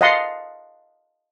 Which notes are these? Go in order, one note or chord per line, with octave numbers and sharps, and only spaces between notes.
D#5 F5 F#5 A5 C6